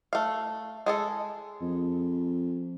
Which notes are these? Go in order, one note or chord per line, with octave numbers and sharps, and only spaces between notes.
A3 F5
G#3 G#4 A4
F2